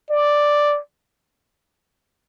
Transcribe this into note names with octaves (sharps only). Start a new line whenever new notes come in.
D5